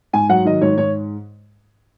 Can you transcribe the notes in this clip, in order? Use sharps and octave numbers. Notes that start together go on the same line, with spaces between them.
G#2 G#5
F#3 F#5
D#3 D#5
G#2 C#5
G#2 C#5